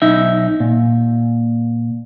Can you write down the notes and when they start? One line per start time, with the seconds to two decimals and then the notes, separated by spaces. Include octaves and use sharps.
0.02 B1 D#4 E5
0.60 A#2